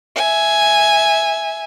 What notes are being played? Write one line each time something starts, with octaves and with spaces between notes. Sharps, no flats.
E5 G#5